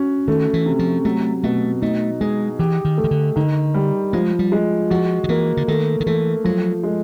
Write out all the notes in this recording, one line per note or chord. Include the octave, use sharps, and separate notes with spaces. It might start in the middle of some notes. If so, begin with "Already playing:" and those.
Already playing: C#4 F#4
D#3 A3
E3
C3
F3
F#3 A3
B2 A3
A3 D#4
G#3 G#4
E3 G4
D#3
A3
D#3
D3
D3 D#3
G3
F3 G#3
G3
G#3
F3 F#4
D#3
E3 A#3
D3
D#3 A3
D#3
E3 A3
F3 F#3
G#3